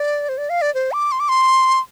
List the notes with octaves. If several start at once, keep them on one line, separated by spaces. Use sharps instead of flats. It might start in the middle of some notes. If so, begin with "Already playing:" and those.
Already playing: D5
C5
D5
F5
D5
C5
D6
C6
D6
C6